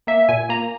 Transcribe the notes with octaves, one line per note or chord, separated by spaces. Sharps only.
A#3 E5
A#2 G#5
A#3 A#5